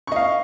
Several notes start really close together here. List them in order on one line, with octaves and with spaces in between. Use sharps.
C#6 D#5 F5